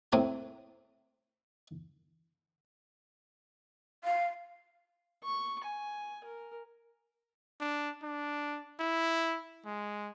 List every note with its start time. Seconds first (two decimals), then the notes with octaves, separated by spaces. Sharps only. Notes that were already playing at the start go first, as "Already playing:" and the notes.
0.12 A2 C4 A#4 G#5
4.04 F5
5.24 C#6
5.64 G#5
6.24 A#4
7.60 D4
8.02 D4
8.79 E4
9.65 G#3